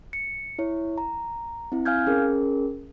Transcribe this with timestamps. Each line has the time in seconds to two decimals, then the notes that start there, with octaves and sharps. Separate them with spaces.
0.13 C#7
0.59 E4 C#5
0.98 A#5
1.72 C4 E4
1.85 F5 G#5 F6 G6 G#6
2.07 C#4 G#4 A#4